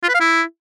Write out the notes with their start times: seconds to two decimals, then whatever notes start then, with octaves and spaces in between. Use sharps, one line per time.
0.03 F4
0.09 B4
0.14 F5
0.20 E4